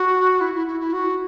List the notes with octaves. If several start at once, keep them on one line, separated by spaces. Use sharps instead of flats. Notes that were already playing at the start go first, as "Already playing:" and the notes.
Already playing: F#4
E4
E4
E4
E4
F#4